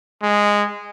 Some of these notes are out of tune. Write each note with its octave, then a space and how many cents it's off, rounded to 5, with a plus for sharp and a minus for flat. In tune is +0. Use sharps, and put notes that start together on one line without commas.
G#3 -10